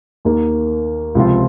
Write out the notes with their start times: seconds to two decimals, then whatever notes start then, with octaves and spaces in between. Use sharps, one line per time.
0.25 D#2 D#3 A#3
1.15 C#2 C3 F3 C4 F4